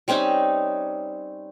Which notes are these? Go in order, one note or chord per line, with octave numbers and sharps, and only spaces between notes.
G3 C4 C#4 D#4